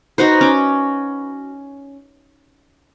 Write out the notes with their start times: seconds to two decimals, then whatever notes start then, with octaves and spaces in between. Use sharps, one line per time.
0.18 D#4 F#4 B4 C5
0.41 C#4 D6